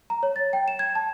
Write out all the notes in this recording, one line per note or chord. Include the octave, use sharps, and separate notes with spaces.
A#5
C#5
A6
G5
E7
G#6
A5